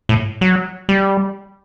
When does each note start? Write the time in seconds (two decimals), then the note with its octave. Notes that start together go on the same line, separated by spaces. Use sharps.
0.09 A2
0.41 F#3
0.89 G3